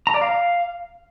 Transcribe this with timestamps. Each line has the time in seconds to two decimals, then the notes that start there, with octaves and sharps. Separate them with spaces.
0.07 A#5
0.14 D5
0.22 F5